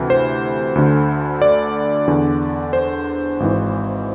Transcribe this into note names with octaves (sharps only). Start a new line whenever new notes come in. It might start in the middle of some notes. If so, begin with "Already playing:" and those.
Already playing: D2 C3 E3
C5
D2 D3
D5
E2 D3
C5
G#1 G#2 E3